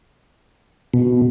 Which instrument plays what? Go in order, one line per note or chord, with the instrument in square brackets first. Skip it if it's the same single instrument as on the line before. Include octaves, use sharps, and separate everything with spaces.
[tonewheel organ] B2